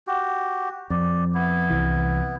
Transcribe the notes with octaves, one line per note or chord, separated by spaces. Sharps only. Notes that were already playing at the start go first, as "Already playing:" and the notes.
F#4 G4
F2 D5
B3 E4
C2 E3